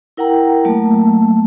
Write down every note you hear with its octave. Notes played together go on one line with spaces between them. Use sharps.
E4 A#4 F#5 G5 A#5
F#3 A3 A#3 A5